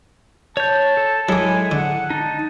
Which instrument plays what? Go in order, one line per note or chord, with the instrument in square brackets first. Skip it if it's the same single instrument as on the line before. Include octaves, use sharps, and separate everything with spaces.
[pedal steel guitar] C#5 G6 [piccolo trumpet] A5
[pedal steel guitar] A4
[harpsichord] F#3 A#3 [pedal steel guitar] G#3 E4 A4 [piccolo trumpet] G#5
[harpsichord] D3 [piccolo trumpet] F#5
[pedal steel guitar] D#4 [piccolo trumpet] A5